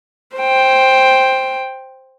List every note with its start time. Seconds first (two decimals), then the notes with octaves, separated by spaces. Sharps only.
0.37 C5 G5